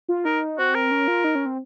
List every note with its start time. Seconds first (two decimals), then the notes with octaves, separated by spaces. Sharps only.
0.09 F4
0.25 D#4 A#4
0.58 C4 F#4
0.75 A#4
0.91 C#4
1.08 F4
1.24 D#4
1.35 C#4
1.46 C4